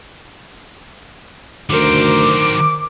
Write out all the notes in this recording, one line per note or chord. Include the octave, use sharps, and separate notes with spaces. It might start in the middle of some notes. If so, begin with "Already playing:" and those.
D2 D#3 F#3 A#4 C5 D6